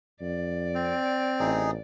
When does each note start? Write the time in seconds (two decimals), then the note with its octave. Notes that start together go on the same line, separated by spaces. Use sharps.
0.21 F2 D5
0.75 C4
1.40 A1 D#4 G#4